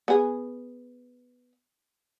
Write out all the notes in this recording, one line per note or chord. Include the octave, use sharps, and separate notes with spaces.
B3 G#4